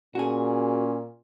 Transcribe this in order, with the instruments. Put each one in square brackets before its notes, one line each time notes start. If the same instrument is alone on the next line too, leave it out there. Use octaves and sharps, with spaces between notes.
[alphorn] A#2 [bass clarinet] C#4 [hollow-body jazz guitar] F#4 G#4